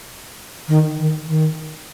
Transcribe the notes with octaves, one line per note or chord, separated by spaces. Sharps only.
D#3
D#3
D#3